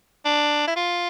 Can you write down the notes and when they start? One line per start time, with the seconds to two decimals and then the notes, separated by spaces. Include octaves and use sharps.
0.25 D4
0.67 E4
0.76 F4